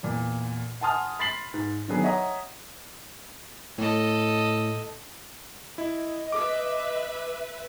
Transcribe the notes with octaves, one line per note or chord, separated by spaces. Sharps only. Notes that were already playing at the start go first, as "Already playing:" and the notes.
E2 A#2
F#5 G#5 A5 C6 D#6 F6
B5 C6 A6 B6 C7 F#7
G#2
D3 D#3 F#3 B3 G#4
C#5 D#5 E5 F#5 A#5 D#6
A2 A4 D#5
E4 D#5
B4 E5 D6